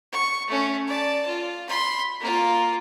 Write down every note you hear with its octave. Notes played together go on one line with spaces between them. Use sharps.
C#6
A3 C#4
D5 A5
F4
B5 C6
A#3 F4